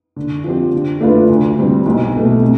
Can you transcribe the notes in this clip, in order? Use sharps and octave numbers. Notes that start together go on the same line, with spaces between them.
D3
F3 C4 G4
D3
A3 D4 F4 B4
D2
D3 G3 C4
B1
B2 A3
C3